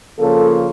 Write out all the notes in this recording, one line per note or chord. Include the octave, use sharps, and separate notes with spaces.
C#3 F3 A#3 A4